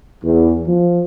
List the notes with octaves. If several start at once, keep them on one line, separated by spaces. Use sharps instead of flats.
E2
F3